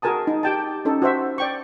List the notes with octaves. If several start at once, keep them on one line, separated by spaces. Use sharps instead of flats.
F#4 G#4 A#4 G#5 A5 D#6
D#4
G4 G5 A5
C#4 D#4 A4
F#4 C5 E5
D5 G5 C#6